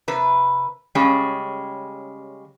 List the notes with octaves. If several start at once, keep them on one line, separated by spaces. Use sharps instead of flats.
C3 B4
C#3 G3 G#3 C#4